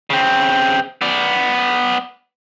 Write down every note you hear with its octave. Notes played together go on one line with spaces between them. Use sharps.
C#3 C4
B3 D5